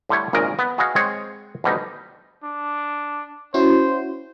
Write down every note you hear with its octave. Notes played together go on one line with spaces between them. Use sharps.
A2 D3 G3 A3 C#5
G#1 A#2 C#3 A#4 D#5
B3
F#4 G#4 B4 D#5 F5 F#5
G#3 C4 G#4 C#5 F#5
D2 B2 G3 D#4
D4
C#4 E4 F#4 C5